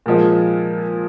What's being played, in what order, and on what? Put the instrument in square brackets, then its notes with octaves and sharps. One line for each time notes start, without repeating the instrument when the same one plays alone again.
[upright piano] A#2 F3 G#3